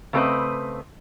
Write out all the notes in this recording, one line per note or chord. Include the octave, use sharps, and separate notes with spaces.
C#3 A3 C4 A4 B4 D#5